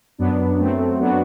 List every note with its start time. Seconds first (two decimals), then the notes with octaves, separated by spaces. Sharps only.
0.18 F#2 F#3 B3 D4
0.58 F#2 F#3 A3 C4
0.99 F#2 F#3 B3 D4 F#4